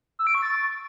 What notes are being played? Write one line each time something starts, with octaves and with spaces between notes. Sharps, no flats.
E6
D7
C#6
A6